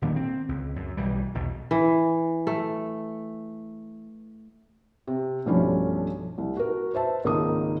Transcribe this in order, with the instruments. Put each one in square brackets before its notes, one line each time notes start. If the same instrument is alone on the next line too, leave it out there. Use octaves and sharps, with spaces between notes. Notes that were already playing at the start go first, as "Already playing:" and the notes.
[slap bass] D#1 D#3 A#3 D4
C4
C#2
F#2
B1 E3 G3
B1 E2 B2
[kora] E3
A3
[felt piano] C3
B1 G2 F3 A3 C#4 B5
C2
F#4 A#4
B4 C5 E5 A5
G#1 C#2 A#3 D#4 D#5 D#6